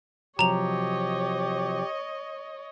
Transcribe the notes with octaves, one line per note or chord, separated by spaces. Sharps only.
C3 F3 F#3 G4 C#5 D#5 A#5 F7